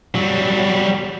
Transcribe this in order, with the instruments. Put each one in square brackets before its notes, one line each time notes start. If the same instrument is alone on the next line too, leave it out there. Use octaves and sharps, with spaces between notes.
[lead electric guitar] F#3 G3